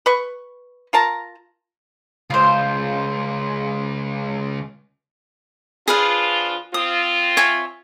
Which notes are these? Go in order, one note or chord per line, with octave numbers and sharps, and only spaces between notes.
B4 C#6
F4 A#4 A5 A#5
C#2 F4 C5
F3 D4 F4 G#4 B4 F5
C4 F4 D#6
C#5 E5 G#5